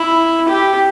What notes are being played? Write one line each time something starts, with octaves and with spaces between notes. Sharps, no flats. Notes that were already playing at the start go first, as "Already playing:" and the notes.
Already playing: E4
G4